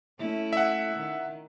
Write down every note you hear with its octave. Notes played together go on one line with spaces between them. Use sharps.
A3 C#4 E4
E5 F#5
D#3